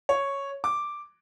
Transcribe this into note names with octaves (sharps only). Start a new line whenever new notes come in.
C#5
D6